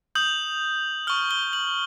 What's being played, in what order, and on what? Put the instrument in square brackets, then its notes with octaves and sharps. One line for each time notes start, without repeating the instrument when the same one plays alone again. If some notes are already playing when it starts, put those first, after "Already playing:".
[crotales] D#6 G6 F#7
C#6 F6 G7
G7
F#7